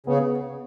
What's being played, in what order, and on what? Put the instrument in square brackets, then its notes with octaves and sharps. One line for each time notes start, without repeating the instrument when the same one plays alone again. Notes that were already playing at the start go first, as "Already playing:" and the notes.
[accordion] C#3 [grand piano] B3